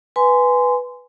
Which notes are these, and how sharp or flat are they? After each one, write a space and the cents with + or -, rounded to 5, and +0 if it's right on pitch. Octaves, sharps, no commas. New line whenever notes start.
B4 +0 G#5 +0 C6 -20